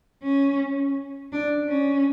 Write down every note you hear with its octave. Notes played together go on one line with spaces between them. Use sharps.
C#4
D4
C#4